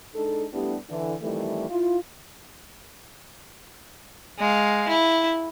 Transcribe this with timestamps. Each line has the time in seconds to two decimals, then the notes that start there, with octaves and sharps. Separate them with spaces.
0.15 G#3 D4 D#4 A4
0.54 G3 A3 B3 D4 E4 G4
0.90 D3 E3
1.22 F2 D#3 E3 G3 A3
1.70 E4 F4
4.39 G#3 F5
4.89 E4